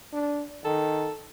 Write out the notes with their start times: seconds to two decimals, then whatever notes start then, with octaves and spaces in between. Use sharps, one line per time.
0.13 D4
0.65 D#3 A4